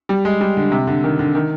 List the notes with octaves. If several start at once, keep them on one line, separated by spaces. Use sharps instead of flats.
G3
G#3
G3
D3
C3
D3
D#3
D3
D#3